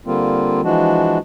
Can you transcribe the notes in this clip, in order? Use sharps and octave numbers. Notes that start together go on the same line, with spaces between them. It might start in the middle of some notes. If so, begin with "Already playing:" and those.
D3 G3 A#3 C4 F4
E3 F3 G#3 D4 F#4